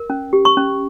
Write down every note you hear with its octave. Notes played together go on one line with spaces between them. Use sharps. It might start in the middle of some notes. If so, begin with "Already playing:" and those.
Already playing: A#4
C#4
G4
C#6
C#4